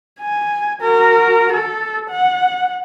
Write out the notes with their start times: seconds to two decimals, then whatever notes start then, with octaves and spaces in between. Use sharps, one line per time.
0.20 G#5
0.81 F#4 A#4
1.53 A4
2.10 F#5